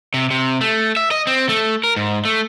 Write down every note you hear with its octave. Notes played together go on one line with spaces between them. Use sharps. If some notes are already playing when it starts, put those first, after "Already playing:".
C3
C3
A3
E5
D#5
C4
A3
A#4
G#2
A3